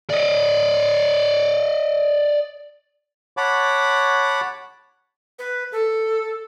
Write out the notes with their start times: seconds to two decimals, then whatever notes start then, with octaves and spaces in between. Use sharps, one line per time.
0.10 D5 D#5
3.37 C#5 F#5 A5 B5 D6
5.39 B4
5.72 A4